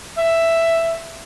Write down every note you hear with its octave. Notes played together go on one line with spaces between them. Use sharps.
E5